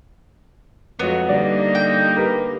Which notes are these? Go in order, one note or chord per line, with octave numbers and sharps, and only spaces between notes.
F2 F#3 G#3 B3
D3 G3 A#3 D#4 D5
G5
G4 A#4 B4